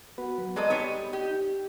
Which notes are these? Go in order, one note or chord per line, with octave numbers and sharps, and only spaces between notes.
B3 F#4 B4
F#3
G#3 A4 B4 D5 D#5 A#5
G3 B3 D#4 C#5
G4